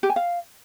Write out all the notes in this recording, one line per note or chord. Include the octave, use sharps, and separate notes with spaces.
G4
G#5
F5